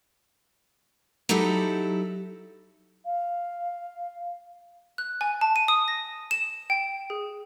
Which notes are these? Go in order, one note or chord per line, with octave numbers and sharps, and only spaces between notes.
F#3 D#4 E4 G4 A4
F5
F#6
G#5
A5
D#7
D#6
A#6
E7
G5
G#4